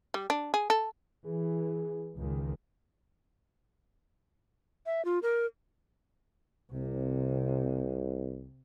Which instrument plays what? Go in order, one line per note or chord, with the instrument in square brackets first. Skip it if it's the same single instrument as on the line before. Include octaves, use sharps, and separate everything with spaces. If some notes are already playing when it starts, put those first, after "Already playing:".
[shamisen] G3
D4
G#4
A4
[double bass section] E3 [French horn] G#4
[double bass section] C#2 D#3
[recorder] E5
F4
A#4
[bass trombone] C2 [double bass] C3